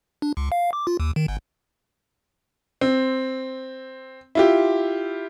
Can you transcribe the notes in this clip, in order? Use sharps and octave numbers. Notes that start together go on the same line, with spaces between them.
D4
C#2
F5
D6
F4
D#2
D#3
G1
C4
E4 F4 G4